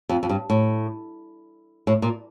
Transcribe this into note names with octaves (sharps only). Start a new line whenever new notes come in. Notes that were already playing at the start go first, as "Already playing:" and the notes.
F2
F2
G2
A2
A2
A#2